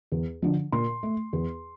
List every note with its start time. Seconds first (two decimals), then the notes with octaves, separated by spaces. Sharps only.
0.12 E2
0.42 D3 F3
0.72 A#2 C6
1.03 A3
1.33 E2